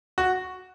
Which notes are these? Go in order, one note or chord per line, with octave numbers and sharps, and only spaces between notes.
F#4